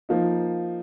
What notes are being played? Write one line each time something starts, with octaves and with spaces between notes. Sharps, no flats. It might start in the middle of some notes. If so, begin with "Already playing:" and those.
F3 A#3 D#4